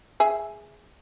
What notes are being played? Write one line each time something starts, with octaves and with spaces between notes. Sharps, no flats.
G#4 E5